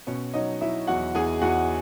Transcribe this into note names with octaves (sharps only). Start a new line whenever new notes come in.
B2 C#4 C#5
F#3 D#4 D#5
F#3 E4 E5
E2 F#4 F#5
E2 G#4 G#5
E2 F#4 F#5